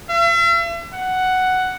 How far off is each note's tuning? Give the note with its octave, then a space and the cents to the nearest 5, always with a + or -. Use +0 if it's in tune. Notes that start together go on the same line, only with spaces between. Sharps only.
E5 +40
F#5 +5